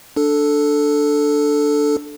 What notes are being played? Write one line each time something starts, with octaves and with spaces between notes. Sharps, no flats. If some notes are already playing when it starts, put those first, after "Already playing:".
D4 A4